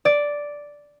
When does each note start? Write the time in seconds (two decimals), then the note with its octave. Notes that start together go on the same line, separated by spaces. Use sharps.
0.05 D5